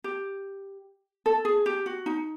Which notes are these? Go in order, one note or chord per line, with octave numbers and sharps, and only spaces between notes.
G4
A4
G#4
G4
F#4
D#4